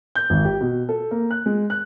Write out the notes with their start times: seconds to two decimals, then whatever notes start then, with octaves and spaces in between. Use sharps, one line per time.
0.15 G6
0.30 G#1
0.45 G4
0.61 B2
0.89 A4
1.11 A#3
1.31 F#6
1.46 G#3
1.70 F#6